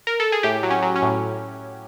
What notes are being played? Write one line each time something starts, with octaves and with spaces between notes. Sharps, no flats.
A#4
A4
G#4
A2 G4
F#3
C#4
F#3
C#4
A2